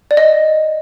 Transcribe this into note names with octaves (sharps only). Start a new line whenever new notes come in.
D5
D#5